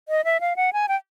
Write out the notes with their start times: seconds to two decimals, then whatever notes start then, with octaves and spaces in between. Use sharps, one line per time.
0.09 D#5
0.25 E5
0.41 F5
0.56 F#5
0.73 G#5
0.88 G5